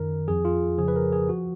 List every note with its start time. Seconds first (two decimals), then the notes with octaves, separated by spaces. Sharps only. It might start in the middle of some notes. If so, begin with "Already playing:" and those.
Already playing: F#2 D#3 A#4
0.28 F2 F3 G#4
0.45 F4
0.78 F2 C#3 F3 G#4
0.88 B4
0.96 A#4
1.13 G#4
1.29 F3 F#4